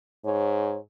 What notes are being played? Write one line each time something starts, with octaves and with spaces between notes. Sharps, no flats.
G#2 C#5